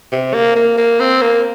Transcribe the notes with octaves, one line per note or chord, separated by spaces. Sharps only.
C3
A#3
A#3
A#3
C4
A#3